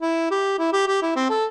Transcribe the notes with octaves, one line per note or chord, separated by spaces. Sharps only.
E4
G4
E4
G4
G4
E4
C4
A4